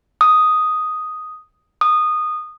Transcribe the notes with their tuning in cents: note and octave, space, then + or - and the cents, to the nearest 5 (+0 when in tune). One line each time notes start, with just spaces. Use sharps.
D#6 +0
D#6 -15